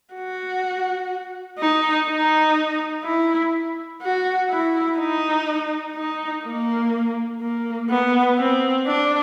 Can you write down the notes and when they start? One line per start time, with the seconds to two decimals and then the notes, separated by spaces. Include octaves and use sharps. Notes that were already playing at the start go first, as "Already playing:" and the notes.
0.14 F#4
1.59 D#4
2.08 D#4
3.04 E4
4.01 F#4
4.50 E4
4.98 D#4
5.95 D#4
6.44 A#3
7.41 A#3
7.89 B3
8.38 C4
8.86 D4